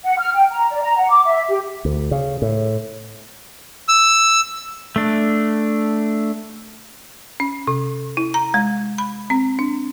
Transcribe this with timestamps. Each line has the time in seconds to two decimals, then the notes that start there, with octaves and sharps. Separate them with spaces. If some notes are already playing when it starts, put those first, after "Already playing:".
0.05 F#5
0.19 F6
0.34 G5
0.50 A#5
0.70 D5
0.82 A#5
0.98 F#5
1.11 D6
1.24 E5
1.49 G4
1.85 D2
2.11 C#3
2.42 A2
3.88 E6
4.96 A3 D4
7.40 C#4
7.67 C3
8.17 E4
8.34 A#5
8.54 G#3
8.98 B5
9.30 C4
9.59 D4